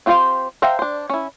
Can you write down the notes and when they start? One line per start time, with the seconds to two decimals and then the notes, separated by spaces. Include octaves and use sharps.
0.06 C4 F4 G4 C5 F5
0.62 C5 E5 F5 G5 A#5
0.79 D4 C5
1.10 C#4 E4